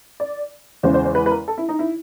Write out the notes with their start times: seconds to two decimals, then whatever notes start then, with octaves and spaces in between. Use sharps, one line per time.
0.20 D5
0.83 E2 C#3 E3 G#3 C5
0.94 C5
1.05 C5
1.15 B4
1.26 B4
1.31 A#4
1.48 A4
1.58 E4
1.69 D#4
1.79 E4